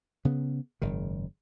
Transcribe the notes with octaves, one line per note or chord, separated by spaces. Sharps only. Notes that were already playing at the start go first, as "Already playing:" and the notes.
C#3 B3
F#1 G#2 D#3